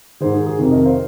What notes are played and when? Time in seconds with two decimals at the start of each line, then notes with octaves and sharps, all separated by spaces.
0.20 G#2 D#3 G#4 C5
0.34 G#4
0.46 G#4
0.59 F2 C3 D#3 A#4
0.72 A#4 D#5
0.85 C5 F5